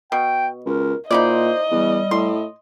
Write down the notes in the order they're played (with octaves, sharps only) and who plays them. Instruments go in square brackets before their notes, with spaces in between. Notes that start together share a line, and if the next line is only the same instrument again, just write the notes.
[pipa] B2 [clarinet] G5
[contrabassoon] C#2 [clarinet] A#4
[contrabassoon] A#2 [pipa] D#4 E4 D5 [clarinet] C5 [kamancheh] D#5
[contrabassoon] E2 [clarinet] G3
[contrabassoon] A2 [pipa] C6